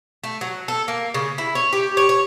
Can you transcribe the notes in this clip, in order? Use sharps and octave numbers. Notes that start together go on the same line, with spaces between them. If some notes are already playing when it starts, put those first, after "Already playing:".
A3
F#3
A4
A#3
C#3
E4
C#5
G4
C#5
C#5